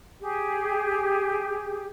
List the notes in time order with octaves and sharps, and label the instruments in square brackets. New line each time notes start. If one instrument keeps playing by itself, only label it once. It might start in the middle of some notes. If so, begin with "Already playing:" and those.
[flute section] G4 G#4